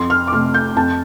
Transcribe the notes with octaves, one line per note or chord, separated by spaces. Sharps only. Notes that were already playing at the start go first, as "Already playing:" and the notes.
Already playing: F2 C6
F6
D6
C3 A3 F6
G6
F2 A5